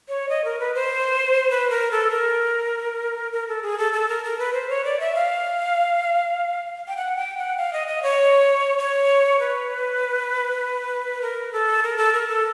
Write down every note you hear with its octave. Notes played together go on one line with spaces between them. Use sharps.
C#5
D#5
A#4
B4
C5
B4
A#4
A4
A#4
A#4
A4
G#4
A4
A4
A#4
A#4
B4
C5
C#5
D5
E5
F5
G5
F#5
G5
F#5
F5
D#5
D#5
C#5
C#5
B4
A#4
A4
A#4
A4
A#4
A4